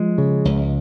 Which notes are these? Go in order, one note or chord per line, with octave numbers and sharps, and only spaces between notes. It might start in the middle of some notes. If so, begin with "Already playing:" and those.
Already playing: F3 G#3
C#3
C#2